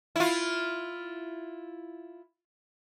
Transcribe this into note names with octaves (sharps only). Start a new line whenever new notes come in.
E4 F4